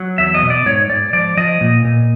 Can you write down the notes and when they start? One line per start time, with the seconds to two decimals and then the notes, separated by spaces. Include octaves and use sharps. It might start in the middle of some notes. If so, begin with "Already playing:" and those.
Already playing: F#3
0.18 E2 E5
0.34 D#5
0.43 B2
0.50 D5
0.66 G#2 C#5
0.90 G#2 D5
1.13 F3 D5
1.37 F3 D#5
1.61 A#2
1.85 A#2